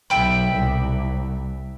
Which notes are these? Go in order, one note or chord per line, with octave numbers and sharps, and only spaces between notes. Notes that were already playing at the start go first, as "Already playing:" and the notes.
B1 E5 G5 B5
C2